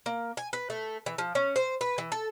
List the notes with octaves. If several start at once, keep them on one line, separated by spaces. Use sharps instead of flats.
A#3
G#5
B4
A3
E3
F3
C#4
C5
B4
E3
A4